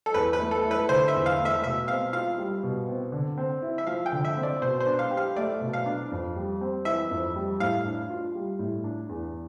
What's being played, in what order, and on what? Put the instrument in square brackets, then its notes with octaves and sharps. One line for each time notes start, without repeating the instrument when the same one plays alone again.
[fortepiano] A4
[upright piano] E2 [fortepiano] B4
[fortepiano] B4
[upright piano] A3
[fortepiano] A4
[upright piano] E4
[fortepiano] B4
[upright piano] D3 [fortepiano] C5
[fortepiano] E5
[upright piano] E2
[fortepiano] F5
[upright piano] A3
[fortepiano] E5
[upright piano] B2 [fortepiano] E5
[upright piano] C4 [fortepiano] F5
[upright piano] F4 [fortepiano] F5
[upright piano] G3
B2
C4
D3
C4
E4
[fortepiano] E5
[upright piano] F3 [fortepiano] F5
[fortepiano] G5
[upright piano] D3
[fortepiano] E5
[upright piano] C4
[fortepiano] D5
[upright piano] B2 [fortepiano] C5
[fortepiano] C5
[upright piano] D4
[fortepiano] F5
[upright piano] G4
[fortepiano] F5
[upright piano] A3 [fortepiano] D5
[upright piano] B2
[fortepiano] F5
[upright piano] D4
F2
G3
C4
[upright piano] E3 [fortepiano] E5
[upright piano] F2
G3
[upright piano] A2 [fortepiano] F5
[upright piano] D4
F4
G3
A2
D4
E2